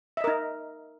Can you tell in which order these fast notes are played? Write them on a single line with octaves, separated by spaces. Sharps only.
E5 D#5 A#4 D#4